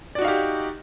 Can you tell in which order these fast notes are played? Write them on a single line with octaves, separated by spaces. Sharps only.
D5 F#4 D#4 F5 G4